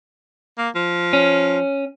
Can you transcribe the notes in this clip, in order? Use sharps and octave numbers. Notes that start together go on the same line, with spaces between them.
A#3
F3
C#4